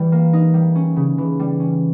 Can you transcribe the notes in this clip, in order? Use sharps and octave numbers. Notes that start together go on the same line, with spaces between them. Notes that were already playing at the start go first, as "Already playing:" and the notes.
Already playing: E3 G3
A#3
D#4
G3
C#4
C#3
E3
G3
C#4